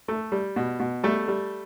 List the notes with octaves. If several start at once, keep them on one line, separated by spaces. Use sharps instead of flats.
A3
G3
B2
B2
G3 A3 A4
G3